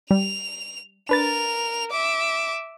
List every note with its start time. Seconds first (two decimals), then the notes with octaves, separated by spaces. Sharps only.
0.11 G3 F7
1.09 D4 A#4 B4 A6 F7
1.91 E5 D6